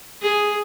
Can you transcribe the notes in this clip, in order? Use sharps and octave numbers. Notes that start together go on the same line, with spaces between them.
G#4